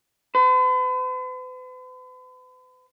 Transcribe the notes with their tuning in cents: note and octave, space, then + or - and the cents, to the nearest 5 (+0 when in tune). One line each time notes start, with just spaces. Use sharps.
B4 +45